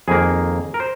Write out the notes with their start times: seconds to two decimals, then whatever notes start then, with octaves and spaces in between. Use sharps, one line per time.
0.08 F2 D#3 A#3 G#4
0.74 A#4
0.80 C5